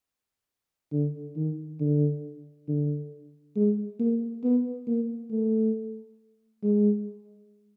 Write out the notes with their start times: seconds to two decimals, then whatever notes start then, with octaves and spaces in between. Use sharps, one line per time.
0.92 D3
1.36 D#3
1.80 D3
2.68 D3
3.56 G#3
4.00 A#3
4.44 B3
4.87 A#3
5.31 A3
6.63 G#3